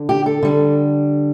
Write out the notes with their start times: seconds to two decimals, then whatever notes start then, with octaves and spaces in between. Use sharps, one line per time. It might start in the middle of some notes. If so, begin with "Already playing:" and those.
Already playing: D3
0.09 G4
0.26 A4
0.43 D3 G3